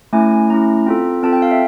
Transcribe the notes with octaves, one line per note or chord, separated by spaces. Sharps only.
A3 C#4 E4 G#5
A3 C#4 E4 A#5
C4 F4 A4
C4 F4 A4 A5
G5
F5
E5